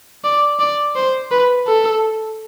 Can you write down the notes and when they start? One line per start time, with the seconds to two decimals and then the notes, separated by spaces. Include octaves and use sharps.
0.24 D5
0.60 D5
0.96 C5
1.31 B4
1.67 A4